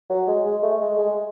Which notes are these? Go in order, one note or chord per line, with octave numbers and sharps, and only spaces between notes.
F#3
G#3
G#3
A3
G#3
G#3